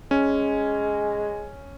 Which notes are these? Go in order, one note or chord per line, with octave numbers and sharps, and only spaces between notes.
G#3 C#4